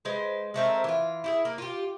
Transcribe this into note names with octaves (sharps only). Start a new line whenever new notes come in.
G#3 B4 C5
G#3 A3 C4 A#4
E3 F4
E4 G4 G#4
A#3
F4 G4